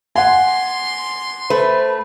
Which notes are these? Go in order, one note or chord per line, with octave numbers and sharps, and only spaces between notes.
F#5 G#5 C6
A3 B4 C5